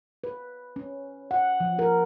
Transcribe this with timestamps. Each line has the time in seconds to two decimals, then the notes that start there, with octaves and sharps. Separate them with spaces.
0.24 B4
0.76 C#4
1.31 F#5
1.60 F3
1.79 A#4